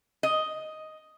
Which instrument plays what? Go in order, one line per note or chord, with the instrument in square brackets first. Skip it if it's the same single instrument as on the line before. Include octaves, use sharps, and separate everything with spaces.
[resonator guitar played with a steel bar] D#5